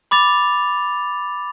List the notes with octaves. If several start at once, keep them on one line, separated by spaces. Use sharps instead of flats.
B5 D6 A6 F7